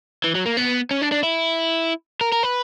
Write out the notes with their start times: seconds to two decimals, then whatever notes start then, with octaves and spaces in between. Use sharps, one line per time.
0.24 E3
0.35 F#3
0.46 A#3
0.57 B3
0.91 C#4
1.02 D4
1.12 D4
1.23 E4
2.21 A#4
2.32 A#4
2.43 B4